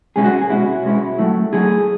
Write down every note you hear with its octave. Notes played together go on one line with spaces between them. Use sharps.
B2 G#3 C#4 E4 G#4
F#4
G#4
B2 G#3 C#4 E4 F#4
B2 G#3 C#4 E4
F#3 A3 E4
F#3 A3 E4 G#4